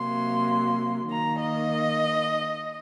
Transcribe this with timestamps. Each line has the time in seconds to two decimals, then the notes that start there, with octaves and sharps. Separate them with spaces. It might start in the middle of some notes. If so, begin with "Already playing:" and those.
Already playing: C3 F#3 A#3 C6
1.10 D#3 A#3 A#5
1.41 D#5